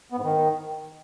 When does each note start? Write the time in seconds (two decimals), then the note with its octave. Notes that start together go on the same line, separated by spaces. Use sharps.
0.12 B3
0.18 G#2
0.23 D#3